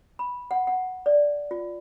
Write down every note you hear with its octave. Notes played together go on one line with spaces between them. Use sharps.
B5
F#5
F#5
D5
F4